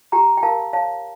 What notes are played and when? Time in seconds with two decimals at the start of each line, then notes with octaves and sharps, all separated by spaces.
0.12 G4 G5 A#5
0.37 G5
0.43 A#4 F5 A5
0.73 C#5 F5 A5